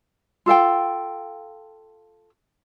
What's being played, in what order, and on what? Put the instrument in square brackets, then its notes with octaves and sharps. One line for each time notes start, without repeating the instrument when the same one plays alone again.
[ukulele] F4 A4 F5 G5